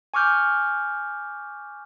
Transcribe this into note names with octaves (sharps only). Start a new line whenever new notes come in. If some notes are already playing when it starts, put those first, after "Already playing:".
G#5 C#6 D6 F6 G6